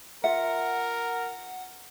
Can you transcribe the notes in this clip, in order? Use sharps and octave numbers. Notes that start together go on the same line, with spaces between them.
F4 A#4 E5 F#5